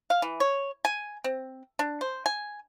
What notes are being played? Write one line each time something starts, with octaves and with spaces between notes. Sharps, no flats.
F5
E3
C#5
G#5
C4
D4
C5
G#5